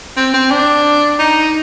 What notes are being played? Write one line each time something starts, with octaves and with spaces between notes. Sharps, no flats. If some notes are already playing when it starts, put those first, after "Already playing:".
C4
C4
D4
D#4